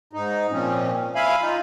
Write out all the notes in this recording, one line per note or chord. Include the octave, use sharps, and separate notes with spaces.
G#2 D#4
A#2 F3 C4 C#4
E5 F5 G#5 B5
D#4 F4